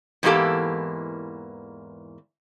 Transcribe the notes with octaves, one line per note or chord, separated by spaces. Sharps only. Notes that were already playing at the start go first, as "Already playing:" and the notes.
E2 G#2 E3 A#3 G4 A4